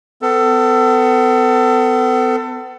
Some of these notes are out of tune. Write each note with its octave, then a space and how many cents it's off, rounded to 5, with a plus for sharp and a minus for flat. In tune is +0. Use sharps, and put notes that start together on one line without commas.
B3 +40 A4 +25